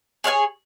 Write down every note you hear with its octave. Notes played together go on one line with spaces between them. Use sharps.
G#4 C#5 F5 G#5